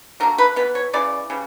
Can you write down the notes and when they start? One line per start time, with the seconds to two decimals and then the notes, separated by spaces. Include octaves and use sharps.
0.20 D3 F#3 A#3 A#4
0.38 B4
0.56 B3 B4
0.60 E3
0.75 C#5
0.93 C#3 E3 D5
1.30 C#3 E3 G3